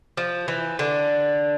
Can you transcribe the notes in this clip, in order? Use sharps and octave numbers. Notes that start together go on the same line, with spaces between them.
F3
E3
D3